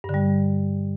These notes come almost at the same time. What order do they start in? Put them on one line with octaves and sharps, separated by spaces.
G2 D3 G3